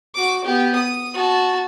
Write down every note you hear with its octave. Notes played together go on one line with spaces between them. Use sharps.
F#4 D6
B3 G4
D#6
F#4 A5